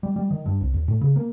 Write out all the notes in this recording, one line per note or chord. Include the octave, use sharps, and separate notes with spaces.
G3
G3
D#3
G2
C2
D#2
A2
C#3
A#3